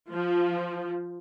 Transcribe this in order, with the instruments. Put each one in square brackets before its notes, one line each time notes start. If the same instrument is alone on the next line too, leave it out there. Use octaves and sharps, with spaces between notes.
[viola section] F3